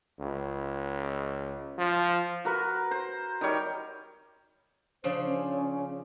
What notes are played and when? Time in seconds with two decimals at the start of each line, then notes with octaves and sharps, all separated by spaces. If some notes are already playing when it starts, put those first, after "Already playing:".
0.19 C#2
1.78 F3
2.45 F#4 A#4 B4
2.91 C5
3.41 D#3 G3 C#5 G5
5.04 C#3 F3 D4 C5
5.26 C#4